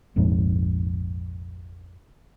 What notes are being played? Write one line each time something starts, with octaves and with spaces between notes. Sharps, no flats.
F1 A#1 F2 G#2